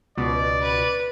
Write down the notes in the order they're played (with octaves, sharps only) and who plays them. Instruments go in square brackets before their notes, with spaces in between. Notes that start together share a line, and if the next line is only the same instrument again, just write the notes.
[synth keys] C#2 B2 [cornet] D5
[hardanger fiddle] B4